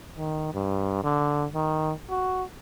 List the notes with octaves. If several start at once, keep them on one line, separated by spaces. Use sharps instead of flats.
D#3
G2
D3
D#3
F#4